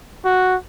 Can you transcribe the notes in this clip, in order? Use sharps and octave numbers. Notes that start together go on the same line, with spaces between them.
F#4